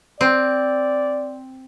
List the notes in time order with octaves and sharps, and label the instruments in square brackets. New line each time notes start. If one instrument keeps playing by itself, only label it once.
[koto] C4 [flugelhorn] D5